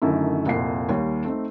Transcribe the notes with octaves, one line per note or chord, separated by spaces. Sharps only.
F#2 D3 D#3 F#3 A3 E4
C2 F2 A#2 A#4 F#5 C7
D#2 G3 C#5
A3 C4 D#4